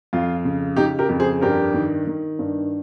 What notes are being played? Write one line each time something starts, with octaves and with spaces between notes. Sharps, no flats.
F2 F4
C#3
C#3 D#4 G4
G4 A#4
F2
G#4 C5
G2 G4 A#4
D#3
D#3
G2